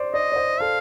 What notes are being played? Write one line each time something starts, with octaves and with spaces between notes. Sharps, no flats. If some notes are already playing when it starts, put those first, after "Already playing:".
Already playing: C5 D5
D5 D#5
D5
C5
A4 F5